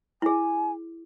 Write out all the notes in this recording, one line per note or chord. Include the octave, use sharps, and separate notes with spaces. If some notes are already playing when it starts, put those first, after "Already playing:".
E4 G#4 G#5